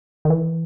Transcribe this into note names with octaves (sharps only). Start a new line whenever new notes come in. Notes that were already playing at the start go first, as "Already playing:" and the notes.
D#3
E3